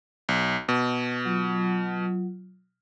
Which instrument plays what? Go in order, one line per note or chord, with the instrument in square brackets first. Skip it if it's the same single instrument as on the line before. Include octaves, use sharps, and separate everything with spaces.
[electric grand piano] B1
B2
[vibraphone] F#3 F4